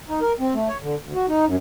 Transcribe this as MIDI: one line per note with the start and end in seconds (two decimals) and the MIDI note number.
0.09 0.20 63
0.22 0.33 70
0.40 0.54 60
0.54 0.68 57
0.69 0.78 73
0.82 0.95 50
1.03 1.13 38
1.15 1.26 66
1.28 1.45 63
1.46 1.56 42